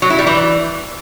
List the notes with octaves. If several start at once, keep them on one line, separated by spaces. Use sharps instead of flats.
F#3
E4
G3
E3